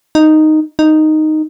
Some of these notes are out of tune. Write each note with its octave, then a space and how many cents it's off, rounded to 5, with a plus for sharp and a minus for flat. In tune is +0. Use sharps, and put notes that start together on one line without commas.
D#4 -5
D#4 -5